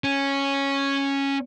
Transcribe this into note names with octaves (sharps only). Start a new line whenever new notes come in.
C#4